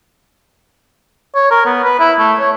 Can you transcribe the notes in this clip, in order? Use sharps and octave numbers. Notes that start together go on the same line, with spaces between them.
C#5
A#4
B3
B4
E4
A3
C#5